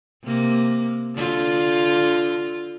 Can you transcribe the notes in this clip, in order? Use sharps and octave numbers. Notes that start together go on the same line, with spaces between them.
C3 A#3
D3 F4